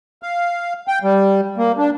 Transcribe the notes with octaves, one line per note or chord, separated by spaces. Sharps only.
F5
G5
G3
A#3
D4